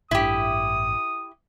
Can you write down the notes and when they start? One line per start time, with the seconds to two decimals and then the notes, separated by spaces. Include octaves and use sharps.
0.11 A1 G2 E4 G4 D#6